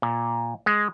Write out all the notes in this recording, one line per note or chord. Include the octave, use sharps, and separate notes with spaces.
A#2
G#3